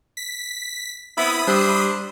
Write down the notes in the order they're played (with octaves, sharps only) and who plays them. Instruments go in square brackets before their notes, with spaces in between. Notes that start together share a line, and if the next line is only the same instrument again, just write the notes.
[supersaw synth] B6
[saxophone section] B3 C4 E4 [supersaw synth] B5 D#6
[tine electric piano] G3 G4 E6 [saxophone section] D4 C5